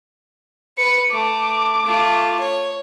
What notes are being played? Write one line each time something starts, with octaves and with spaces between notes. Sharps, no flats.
B4 C#7
A3 D6
A3 F4
C#5